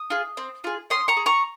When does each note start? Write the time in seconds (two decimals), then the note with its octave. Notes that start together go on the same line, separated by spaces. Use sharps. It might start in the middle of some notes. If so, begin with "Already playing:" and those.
Already playing: D#6
0.10 F4 G#4
0.37 C4
0.64 F4 G#4
0.90 C#4 C6 D#6
1.08 A#5 C#6
1.17 G#4
1.26 A#5 C#6